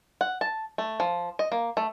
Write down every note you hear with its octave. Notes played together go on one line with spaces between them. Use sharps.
F#5
A5
A3
F3
D#5
A#3
A3